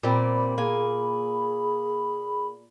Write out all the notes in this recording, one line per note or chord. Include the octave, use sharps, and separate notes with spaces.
A#2 G3 C4 B5
A#3 G#4 G#5